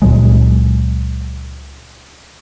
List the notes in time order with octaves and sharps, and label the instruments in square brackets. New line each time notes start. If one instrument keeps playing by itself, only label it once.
[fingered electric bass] C#2 A#2 F#3 G#3